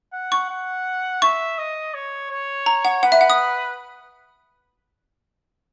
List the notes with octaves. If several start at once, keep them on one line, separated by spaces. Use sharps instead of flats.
F#5
C#6
F#5
E5 C#6
D#5
C#5
C#5
A#5
F#5
B4 F#5
E5
F#5
D#6